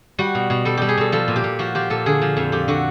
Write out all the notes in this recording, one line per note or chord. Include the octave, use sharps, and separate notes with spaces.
G3 F#4
B2
B2
G3 A4
G3 G4
G#4
B2 A4
F3 A4
A#2
G4
A#2
F3 F#4
F3 G4
A#2 A4
D3 G#4
F3
F2
F2 G4
D3 F#4